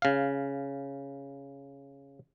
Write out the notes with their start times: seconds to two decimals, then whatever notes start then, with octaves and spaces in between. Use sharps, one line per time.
0.02 C#3 F5